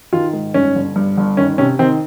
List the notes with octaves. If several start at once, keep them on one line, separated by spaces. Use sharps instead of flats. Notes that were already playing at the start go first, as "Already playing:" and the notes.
D#3 F4
G#2
G1 C#4
G1
G2
G1
D#3 C#4
C3 C#4
D#3 C4